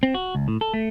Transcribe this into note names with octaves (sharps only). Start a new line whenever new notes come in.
C4
F#4
C#2
A2
A4
A3